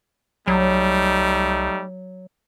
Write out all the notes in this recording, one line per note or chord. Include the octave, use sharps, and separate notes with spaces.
C2 F#3 G3 A3 D#4